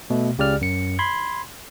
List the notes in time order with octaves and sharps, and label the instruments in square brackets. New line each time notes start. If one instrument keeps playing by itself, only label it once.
[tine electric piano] B2 A3
C#2 C#3 G4 D5 F6
F#2 C#7
B5 C6 G#6